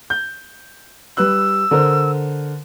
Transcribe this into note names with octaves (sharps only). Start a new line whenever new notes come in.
G6
G3 B4 E6 F#6
D3 A#4 C5